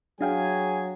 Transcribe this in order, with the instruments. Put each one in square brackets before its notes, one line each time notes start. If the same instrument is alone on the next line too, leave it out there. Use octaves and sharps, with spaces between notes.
[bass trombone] F#3 [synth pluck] D4 F5 G5 [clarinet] G#4 [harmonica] G#5